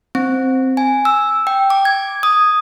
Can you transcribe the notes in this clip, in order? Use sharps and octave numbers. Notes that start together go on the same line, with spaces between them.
C4
G#5
E6
G5
D6
G#6
D#6